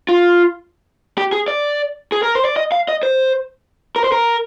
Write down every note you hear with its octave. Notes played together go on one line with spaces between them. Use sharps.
F4
G4
G#4
D5
G#4
A#4
C5
D5
D#5
F5
D#5
C5
A#4
C5
A#4